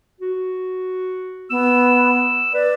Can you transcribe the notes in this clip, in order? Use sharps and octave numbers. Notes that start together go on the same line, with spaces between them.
F#4
B3 E6
B4 D5